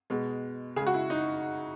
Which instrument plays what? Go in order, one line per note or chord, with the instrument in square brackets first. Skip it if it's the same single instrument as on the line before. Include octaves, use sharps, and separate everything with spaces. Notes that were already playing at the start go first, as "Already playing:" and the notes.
[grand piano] B2 G#3
C#3 G#4
G#3
F#4
E4
D#4